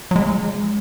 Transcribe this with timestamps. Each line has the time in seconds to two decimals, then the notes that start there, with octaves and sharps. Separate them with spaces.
0.11 F#3
0.16 G#3